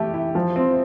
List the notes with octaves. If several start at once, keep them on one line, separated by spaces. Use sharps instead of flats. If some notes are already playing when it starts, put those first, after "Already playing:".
Already playing: E3 A3 E4 G4
E4
F3
C4